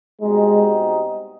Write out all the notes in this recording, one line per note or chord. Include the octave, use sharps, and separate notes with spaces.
B2 G3 G#3 C4 D#4